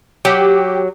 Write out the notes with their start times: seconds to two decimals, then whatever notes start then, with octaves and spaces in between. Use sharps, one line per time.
0.25 F#3 G4